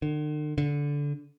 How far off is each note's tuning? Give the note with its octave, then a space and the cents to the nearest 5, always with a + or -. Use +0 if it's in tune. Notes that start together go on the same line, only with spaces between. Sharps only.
D3 +45
D3 -20